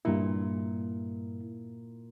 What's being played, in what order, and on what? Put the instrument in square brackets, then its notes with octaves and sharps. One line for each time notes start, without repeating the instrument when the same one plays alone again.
[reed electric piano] G2 E4 [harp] A#2